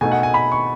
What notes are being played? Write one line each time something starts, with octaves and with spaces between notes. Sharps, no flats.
B2 A3 D#4 G#5
F#5
G#5
B5
C#6